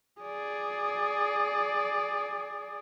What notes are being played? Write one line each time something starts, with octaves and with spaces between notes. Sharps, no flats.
G#4 D5